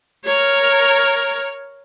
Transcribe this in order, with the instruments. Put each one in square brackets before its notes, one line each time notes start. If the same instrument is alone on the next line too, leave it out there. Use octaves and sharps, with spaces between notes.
[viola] A#4 C#5